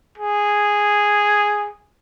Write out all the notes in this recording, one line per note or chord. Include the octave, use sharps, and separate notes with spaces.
G#4